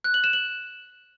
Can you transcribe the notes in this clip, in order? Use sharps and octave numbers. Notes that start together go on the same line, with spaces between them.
F#6
F#7
E7
F#7